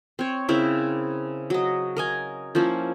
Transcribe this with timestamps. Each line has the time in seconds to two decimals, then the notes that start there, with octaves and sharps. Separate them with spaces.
0.19 C4 C#5
0.49 C#3 C4 E4 A#4
1.50 F#3 D#5
1.97 A#4 D#5 G#5
2.55 F3 A#3 C#4 E4